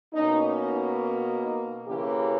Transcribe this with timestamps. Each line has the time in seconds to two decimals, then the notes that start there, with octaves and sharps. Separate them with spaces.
0.14 B2 A#3 C#4 D#4
1.01 C#4
1.44 D#4
1.87 C#3 E3 A#3 C#4 G4